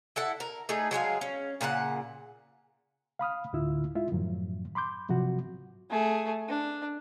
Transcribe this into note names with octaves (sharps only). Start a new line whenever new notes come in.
E4 A4 F#5
A#4
A3 D#4 G#4
F#3 G#3 G#4 F5
C#4
A#2 C#3 A4 F#5
F5 B5 D#6 F6
D2 A2 D3 E4 F4 E6
G#3 E4 F4 E5
F#2 A2 D#3 F3 F#3
B5 C6 D6 G6
G#2 C3 F3 F#3 F#4
A3 G#4
D4